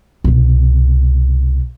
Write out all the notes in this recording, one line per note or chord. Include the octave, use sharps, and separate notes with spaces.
C2 B2